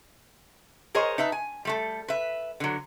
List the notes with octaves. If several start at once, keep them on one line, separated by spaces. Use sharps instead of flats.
G#4 A#4 C5 C#5 D#5
D#4 B4 E5 A5
G#5
G3 A3 A4
B4 E5
D3 F#3